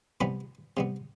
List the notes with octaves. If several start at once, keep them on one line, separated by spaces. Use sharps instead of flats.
C3 E3 G3 B3 B5
C3 G3 B3